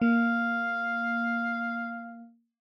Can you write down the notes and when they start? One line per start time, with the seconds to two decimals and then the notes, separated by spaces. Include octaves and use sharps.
0.02 A#3 F5